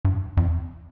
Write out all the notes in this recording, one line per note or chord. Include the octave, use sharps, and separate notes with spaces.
G2
F2